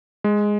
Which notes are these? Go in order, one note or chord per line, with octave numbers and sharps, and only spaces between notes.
G#3